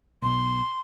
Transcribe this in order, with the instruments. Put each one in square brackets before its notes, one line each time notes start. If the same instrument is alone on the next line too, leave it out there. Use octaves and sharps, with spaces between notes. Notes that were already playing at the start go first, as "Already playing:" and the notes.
[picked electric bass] B1 B2 [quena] C6